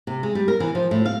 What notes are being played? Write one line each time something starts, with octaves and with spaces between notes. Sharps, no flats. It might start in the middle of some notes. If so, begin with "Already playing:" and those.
C3
G#3
G3
A#4
E3
F3
A2
F5